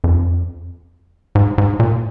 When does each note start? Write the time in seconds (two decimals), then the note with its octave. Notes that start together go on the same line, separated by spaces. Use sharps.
0.04 F2
1.35 G#2
1.58 G#2
1.80 A#2